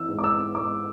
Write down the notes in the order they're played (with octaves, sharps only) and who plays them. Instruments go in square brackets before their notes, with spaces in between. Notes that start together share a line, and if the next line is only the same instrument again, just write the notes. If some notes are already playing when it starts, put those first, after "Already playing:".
Already playing: [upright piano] E3 E6
G#2
D6
E6
G#2 D6